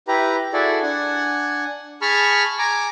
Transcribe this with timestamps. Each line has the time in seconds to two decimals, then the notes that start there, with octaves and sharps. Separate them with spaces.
0.08 E4 G4 B4 A#5
0.53 E4 F#4 G#4 A4 D5
0.83 D4 F#5 G#5
2.02 G#4 A5 B5 C#6 F6
2.59 G#5 A#5 D6